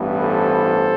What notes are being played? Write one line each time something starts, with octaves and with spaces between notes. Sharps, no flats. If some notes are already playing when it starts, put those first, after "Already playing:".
Already playing: A1 G2 E3 B3
A4 C5